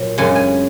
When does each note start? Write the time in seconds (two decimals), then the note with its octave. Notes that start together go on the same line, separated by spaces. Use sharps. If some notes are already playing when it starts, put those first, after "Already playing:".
Already playing: A#2 F#3
0.18 F#2 C#3 G#3 G#5
0.35 G#5